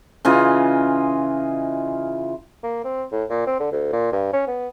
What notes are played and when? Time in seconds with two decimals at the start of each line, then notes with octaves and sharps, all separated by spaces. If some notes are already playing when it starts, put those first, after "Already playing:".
0.25 C#3 E3 F4 D#5
2.63 A#3
2.84 C4
3.12 A2
3.30 A#2
3.47 C4
3.60 D3
3.72 D2
3.92 A#2
4.12 G2
4.33 C#4
4.47 B3